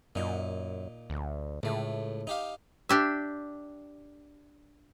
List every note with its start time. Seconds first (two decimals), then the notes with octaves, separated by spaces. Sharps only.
0.15 F#2 A#2 D#4
1.10 D2
1.63 C#2 A2 A3
2.27 D#4 G4 F5
2.89 D4 G4 E5